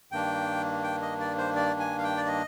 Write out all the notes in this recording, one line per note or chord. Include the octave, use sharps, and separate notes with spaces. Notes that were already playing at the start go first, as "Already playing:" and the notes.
G2 D#3 A#3 D4 G5
G5
D#5
D5
C5
D5
G#5
F5
G5
D5
D#5